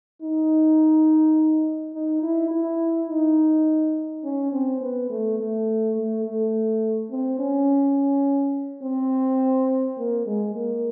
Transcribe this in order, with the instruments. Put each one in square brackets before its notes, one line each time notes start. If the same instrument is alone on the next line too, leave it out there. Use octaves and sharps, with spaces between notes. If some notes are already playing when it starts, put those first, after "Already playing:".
[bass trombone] D#4
D#4
E4
E4
D#4
C#4
C4
B3
A3
A3
A3
A3
C4
C#4
C4
A#3
G#3
A#3